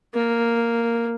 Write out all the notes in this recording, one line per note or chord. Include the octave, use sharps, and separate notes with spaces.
A#3